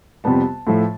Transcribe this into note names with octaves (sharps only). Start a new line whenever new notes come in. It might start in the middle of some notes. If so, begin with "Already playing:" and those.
F2 C3 G3 B3 A5
A2 F3 A3